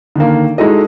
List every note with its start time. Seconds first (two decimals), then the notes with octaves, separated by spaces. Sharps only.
0.16 D3 D#3 A#3
0.58 G#3 D#4 E4 F#4 A4 D#5